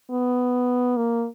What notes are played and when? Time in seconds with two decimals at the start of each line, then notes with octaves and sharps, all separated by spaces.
0.11 B3
0.97 A#3